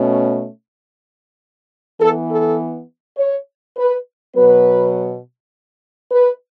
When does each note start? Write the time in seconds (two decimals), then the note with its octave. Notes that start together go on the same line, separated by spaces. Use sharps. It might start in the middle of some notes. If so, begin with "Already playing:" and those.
Already playing: B2 A3 C#4
2.00 E3 B3 A4
2.29 A4
3.17 C#5
3.77 B4
4.35 B2 F#3 B3 B4
6.11 B4